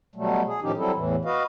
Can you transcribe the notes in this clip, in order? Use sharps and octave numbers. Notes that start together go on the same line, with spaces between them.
B2 F#3 G3 A3
G#4
A2 D#3 F3 C#4 D#4 G4
F#3 G3 C4 E4 A4
E2 A2 E3
F#4 B4 D#5 F5